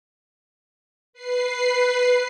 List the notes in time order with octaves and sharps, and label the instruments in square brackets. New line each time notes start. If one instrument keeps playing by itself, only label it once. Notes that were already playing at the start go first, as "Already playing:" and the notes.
[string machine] B4 C7